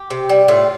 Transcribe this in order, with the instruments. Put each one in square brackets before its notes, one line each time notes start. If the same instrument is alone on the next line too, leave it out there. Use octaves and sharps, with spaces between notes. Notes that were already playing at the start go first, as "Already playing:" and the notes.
Already playing: [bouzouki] G4
C3
G3
A2 F4